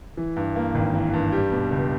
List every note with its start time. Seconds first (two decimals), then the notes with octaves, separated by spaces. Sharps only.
0.17 E3
0.36 G2
0.56 A#3
0.75 G#1
0.94 E3
1.13 G2
1.32 G3
1.52 B2
1.71 C#2